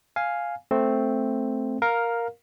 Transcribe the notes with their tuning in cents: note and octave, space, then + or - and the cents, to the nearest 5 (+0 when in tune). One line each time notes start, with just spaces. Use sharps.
F5 +0 G#5 +0
A3 +0 C4 +0
A#4 +0 F5 +10